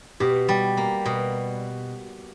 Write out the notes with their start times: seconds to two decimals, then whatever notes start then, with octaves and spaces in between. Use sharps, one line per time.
0.20 B2 G4
0.49 G3
0.77 A#3
1.06 B2